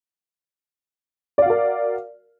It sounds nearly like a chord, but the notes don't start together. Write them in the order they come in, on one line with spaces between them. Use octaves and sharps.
D5 F5 F#4 A#4